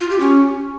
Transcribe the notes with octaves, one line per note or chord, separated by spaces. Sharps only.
F4
G4
C#4